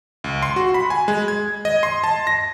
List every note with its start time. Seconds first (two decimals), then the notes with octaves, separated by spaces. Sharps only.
0.24 C#2
0.42 C6
0.56 F#4
0.74 B5
0.90 G#5
1.08 G#3
1.28 G#6
1.65 D#5
1.83 C6
2.04 A5
2.27 A#6